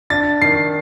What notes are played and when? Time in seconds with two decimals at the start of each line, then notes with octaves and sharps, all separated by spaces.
0.10 D4 A6
0.42 D#3 C7